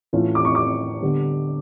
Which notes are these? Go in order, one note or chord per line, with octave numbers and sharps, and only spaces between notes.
A2 E3 A3 C#4 F4
D6
C#6
D6
D3 G3 B3